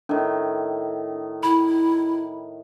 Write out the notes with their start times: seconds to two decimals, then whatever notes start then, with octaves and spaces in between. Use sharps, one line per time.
0.09 A2 D#3 D4
1.43 E4 B5